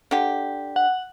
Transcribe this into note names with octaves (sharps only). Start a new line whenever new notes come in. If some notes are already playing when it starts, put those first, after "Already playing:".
D3 G4
F#5